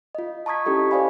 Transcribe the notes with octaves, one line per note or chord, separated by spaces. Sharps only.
F4 D#5
A5 A#5 C#6 D#6 G#6 B6
C#4 E4 G4 A4 D#5
C5 D5 F5 G#5 B5